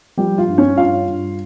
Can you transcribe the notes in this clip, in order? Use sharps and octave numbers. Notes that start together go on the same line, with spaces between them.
F3 G3 G4
F4
G2
C#4 C#5
G2 F4 F5
G2